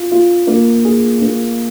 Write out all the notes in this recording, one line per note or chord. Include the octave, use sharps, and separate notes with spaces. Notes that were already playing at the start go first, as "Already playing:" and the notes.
Already playing: F4
F4
A#3
G#4
A#3